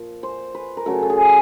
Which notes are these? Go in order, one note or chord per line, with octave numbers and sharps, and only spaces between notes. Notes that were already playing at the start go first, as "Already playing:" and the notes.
Already playing: A#2 F3
C5
B4
A#4
C#3 F#3 A3 A4
A4
G#4